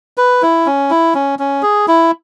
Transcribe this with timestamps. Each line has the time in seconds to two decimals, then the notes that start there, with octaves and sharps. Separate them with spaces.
0.17 B4
0.42 E4
0.66 C#4
0.90 E4
1.15 C#4
1.39 C#4
1.62 G#4
1.88 E4